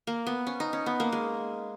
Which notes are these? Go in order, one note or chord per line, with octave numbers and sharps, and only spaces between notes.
A#3
B3
C#4
D#4
C#4
B3
A#3
G#3